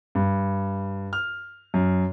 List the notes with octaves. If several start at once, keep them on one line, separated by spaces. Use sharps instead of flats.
G2
F6
F#2